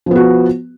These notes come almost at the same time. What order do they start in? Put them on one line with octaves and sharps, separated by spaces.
F3 B3 F#4